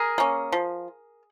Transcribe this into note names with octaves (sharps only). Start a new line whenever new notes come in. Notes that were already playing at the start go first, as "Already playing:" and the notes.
Already playing: G#4 A#4
A#3 C#4
F3